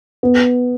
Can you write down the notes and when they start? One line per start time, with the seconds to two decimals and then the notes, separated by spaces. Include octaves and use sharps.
0.23 B3